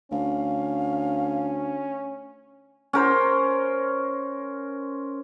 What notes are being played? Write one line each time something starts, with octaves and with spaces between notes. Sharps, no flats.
D2 C#4 F5
C#4 A#4 C5